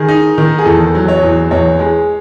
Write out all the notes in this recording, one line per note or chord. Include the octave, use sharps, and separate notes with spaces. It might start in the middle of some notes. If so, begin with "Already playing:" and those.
Already playing: D#3 G#4
D#4
D#3
G#4
E2 A4
F#3
C#5
E2
E2 C#5
G#3